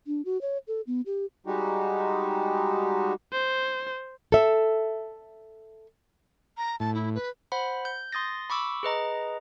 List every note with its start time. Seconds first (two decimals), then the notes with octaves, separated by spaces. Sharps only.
0.07 D4
0.25 F#4
0.41 C#5
0.68 A4
0.87 B3
1.06 G4
1.47 G3 G#3 D#4 F#4 G4
3.33 C5
4.32 A4 E5
6.57 A#5
6.80 A2 A5
6.95 E4
7.15 B4
7.52 C5 F#5 B5
7.85 G6
8.12 C6 D#6 A6 A#6
8.50 B5 C#6 D6 E6
8.83 G#4 B4 D#5 A#5